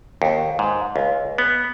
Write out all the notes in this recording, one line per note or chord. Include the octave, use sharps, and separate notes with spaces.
D#2
G#2
C#2
B3